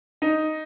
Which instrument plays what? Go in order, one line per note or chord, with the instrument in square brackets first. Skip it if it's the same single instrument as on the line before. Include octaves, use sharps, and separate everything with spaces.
[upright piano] D#4